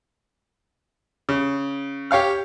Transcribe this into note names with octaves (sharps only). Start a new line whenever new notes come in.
C#3
G4 C#5 F5 F6